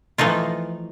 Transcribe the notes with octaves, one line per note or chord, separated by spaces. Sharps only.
E3 F3 A3 D#4 F4